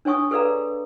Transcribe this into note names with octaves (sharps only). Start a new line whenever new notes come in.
D4 C#5 G#5 C#6 D#6
G#4 A4 B4 D5 F5 A#5